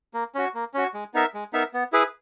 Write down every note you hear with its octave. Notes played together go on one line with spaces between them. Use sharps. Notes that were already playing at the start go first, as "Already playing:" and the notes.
A#3
C#4 F#4
A#3
C#4 F#4
G#3
B3 D#4 A#4 E5
G#3
B3 D#4 A#4 E5
B3
E4 G#4 B4